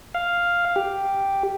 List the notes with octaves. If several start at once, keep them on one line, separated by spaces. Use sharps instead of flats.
F5
G4